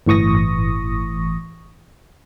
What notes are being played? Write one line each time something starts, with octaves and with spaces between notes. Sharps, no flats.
G1 A2 E3 C#6 D#6 A#6